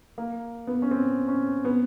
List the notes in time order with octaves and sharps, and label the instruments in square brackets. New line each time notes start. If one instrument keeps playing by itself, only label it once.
[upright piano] A#3
B3
C#4
C4
C#4
B3